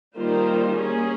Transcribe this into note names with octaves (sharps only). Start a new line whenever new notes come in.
D#3 G3 A#3 F4 C5
A#3 C#4 G#4